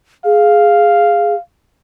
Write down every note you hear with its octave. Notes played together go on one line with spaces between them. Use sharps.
G#4 F5